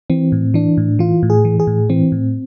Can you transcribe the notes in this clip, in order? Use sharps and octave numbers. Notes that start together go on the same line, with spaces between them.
E3 C4
A2
E3 D4
A2
E3 F4
A2
G#4
E3
G#4
A2
E3 C4
A2